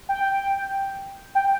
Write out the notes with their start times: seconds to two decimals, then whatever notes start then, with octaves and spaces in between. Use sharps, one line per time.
0.09 G5
1.35 G5